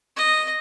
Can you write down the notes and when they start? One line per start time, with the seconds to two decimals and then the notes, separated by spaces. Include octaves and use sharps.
0.17 D#5